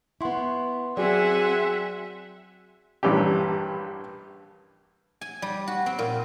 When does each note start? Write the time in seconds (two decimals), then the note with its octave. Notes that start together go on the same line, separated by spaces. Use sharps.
0.21 B3 E4 F#5 C6 C#6
0.97 F#3 C4 F#4 G#4 D5 E5 F#5 G#5
3.03 A#1 G2 E3 C#4 G4
5.21 G#5
5.42 G3
5.67 F#4
5.86 C4
5.99 A#2